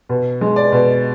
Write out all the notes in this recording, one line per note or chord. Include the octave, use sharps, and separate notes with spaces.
B2
G#3
D5
B2